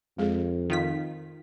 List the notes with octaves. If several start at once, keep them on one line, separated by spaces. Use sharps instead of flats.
F2 G#3 G#4
D#3 F4 B6